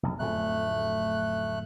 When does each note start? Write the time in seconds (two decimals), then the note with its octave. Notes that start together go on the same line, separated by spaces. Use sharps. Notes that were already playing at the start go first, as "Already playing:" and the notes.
0.03 F1 B1
0.19 D1 F2 A3 F#6